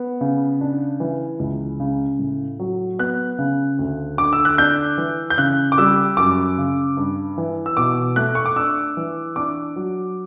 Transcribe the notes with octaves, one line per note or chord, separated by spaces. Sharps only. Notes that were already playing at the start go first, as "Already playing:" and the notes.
Already playing: B3
C#3
D4
E3
C#2
C#3
A2
F#3
B3 F#6
C#3
D2
D3 D6
E6
F#6
D4 G6
E3
G6
C#3 F#6
D6
G3 E6
F#2 D6
C#3
G2
E3
E6
B2 D6
A3 F#6
C#6
D6
D4 E6
E3
D4 D6
F#3